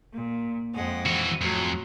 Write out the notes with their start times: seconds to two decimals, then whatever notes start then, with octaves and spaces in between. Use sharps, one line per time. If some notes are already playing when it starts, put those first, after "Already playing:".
0.12 A#2
0.74 F2 G#3 F#5
1.06 E3 F#4
1.42 F2 A2 F#3